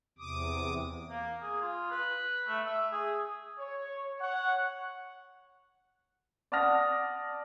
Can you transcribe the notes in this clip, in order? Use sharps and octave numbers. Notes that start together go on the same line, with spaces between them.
E2 C3 D6 D#6
A#3
G#4
F4
B4
A3
E5
G#4
C#5
C#5 F#5
D5 F#5 A5 D#6 F6 A#6